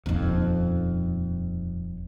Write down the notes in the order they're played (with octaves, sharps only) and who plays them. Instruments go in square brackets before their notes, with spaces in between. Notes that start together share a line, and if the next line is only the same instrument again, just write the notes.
[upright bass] D#1 D#4 [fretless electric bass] F2